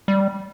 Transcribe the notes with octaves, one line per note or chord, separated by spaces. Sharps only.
G3